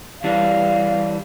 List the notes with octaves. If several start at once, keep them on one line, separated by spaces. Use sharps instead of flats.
E3 G3 D4 F5